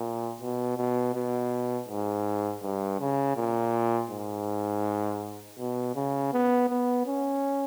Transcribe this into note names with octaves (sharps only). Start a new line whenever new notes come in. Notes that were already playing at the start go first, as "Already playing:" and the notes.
Already playing: A#2
B2
B2
B2
G#2
G2
C#3
A#2
G#2
B2
C#3
B3
B3
C#4